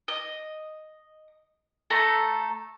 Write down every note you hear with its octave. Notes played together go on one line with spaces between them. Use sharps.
D#5
A3 A4 A#5